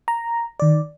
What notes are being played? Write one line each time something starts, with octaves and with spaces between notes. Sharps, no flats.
A#5
D#3 D5